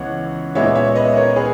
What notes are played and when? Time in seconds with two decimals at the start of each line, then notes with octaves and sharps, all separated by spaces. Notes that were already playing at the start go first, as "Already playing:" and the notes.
Already playing: C#2 E3 B3 C#5 F#5
0.55 A#2 G#3 B3 C#5 E5
0.75 C#5 E5
0.96 B4 D#5
1.16 A#4 C#5
1.36 G#4 B4